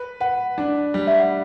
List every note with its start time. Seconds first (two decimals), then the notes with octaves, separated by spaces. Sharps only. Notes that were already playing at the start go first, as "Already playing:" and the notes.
Already playing: B4
0.20 B4 F#5
0.58 D4
0.94 G3
1.07 E5
1.19 F#5